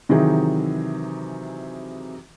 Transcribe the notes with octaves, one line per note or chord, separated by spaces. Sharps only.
C3 D#3 E3 F#3 D#4 G#4